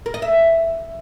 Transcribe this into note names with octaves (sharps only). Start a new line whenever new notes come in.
A#4
D#5
E5